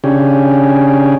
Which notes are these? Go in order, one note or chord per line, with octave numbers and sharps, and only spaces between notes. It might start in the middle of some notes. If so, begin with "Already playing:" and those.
C#3 C#4 D4 G4 G#4